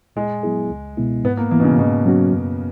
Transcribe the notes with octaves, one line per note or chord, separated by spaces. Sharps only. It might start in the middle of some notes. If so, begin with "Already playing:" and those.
A#2 G#3
F#3 B3 E4 G#4
C#2
B2 G#3 B3 E4
G#2 B3
A#3
E3 A#3 B3 E4
B2
C#3
G#2 B2
F#3 C#4 F#4
F#2